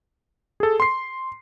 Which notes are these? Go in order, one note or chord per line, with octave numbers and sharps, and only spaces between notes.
G#4 A4
C6 C7